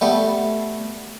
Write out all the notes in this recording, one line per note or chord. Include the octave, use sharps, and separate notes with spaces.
G3 A3 B3